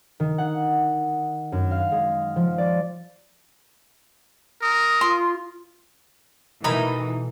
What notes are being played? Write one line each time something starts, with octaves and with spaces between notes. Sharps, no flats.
D#3
F#5
F#2
F5
G#3
F3
D5
A#4 D#6
F4 C6
B2 E3 A3 D#4 E4 A#4 A#5 B5